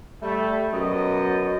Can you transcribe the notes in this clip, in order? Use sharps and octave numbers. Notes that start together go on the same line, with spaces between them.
G3 A3
F#2 B2 F#3 D#5